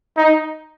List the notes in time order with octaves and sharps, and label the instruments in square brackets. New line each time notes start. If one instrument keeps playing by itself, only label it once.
[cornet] D#4